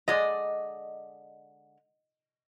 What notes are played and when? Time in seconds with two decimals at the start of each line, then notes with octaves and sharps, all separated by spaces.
0.08 D3 G#3 D5 D#5